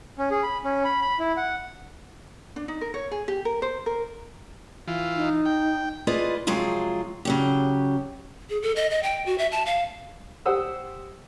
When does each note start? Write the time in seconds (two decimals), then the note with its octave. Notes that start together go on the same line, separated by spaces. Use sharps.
0.18 C#4
0.31 G#4
0.43 B5
0.64 C#4
0.85 B5
1.02 B5
1.19 E4
1.37 F#5
2.56 D4
2.68 D#4
2.81 A#4
2.94 C#5
3.11 G#4
3.28 G4
3.45 A#4
3.62 C5
3.86 A#4
4.88 E3 F4
5.16 D#4
5.46 G5
6.07 F4 G#4 B4 C5 D5 D#5
6.47 C3 F3 F#3 G#3 F4 G#4
7.25 C#3 F#3 G4
8.50 G#4
8.62 A4
8.76 D#5
8.90 D#5
9.03 G5
9.26 F#4
9.38 E5
9.52 A5
9.66 F5
10.46 G4 C5 F#5 D#6 E6